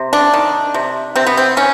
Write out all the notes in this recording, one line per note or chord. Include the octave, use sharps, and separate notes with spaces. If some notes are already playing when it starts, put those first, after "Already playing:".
Already playing: C3
D4
D#3
C3
C3 C4
B3
C4
D#3 C#4